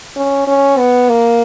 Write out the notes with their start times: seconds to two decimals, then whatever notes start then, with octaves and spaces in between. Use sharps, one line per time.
0.16 C#4
0.47 C#4
0.78 B3
1.09 A#3